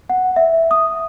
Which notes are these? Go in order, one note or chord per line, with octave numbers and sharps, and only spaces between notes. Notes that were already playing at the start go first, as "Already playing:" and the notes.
F#5
E5
D#6